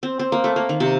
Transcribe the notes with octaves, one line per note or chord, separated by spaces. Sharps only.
C4
C4
A#3
A3
A#3
D#3
C3